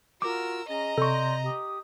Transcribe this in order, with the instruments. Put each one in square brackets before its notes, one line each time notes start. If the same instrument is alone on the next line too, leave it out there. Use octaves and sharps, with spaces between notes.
[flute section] F4 F#4 [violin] A#4 E6 [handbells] D6
[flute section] C#4 G#4 [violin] D#5 A#5
[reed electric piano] C3 [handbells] A4 C#6 [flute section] D5 C6 G6
[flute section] G4 D#6